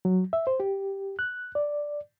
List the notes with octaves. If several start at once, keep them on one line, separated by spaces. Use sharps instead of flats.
F#3
E5
C5
G4
F#6
D5